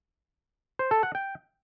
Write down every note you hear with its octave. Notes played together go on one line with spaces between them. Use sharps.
C5
A4
F#5
G5